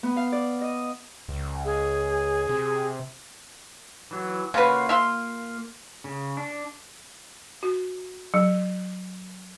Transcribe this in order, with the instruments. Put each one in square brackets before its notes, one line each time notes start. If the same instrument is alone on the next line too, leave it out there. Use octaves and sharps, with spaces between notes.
[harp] B3
F5
D5
D#5
[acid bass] C#2
[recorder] G#4
[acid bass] C3
[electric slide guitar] E3 F#3
[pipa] C#3 F#4 B4 [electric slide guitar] A#3 F4
[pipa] E5 F5 C6
[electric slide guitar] C#3
D4
[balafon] F#4
F#3